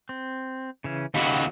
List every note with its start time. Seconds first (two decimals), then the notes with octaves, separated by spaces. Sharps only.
0.09 C4
0.84 C#3 E3 C#4
1.14 D#2 C#3 F#3 B5